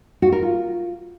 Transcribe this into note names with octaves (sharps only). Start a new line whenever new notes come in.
F#4
A#4
F4